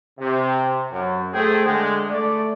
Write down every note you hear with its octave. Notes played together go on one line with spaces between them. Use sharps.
C3
F#2
A3 G#4 C5 G5
D3 G#3
A3 D5